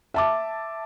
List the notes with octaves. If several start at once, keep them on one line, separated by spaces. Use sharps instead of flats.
E5 A5 D6